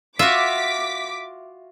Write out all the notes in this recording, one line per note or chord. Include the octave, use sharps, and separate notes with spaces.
F4 F#4 E5 F5 D6 B6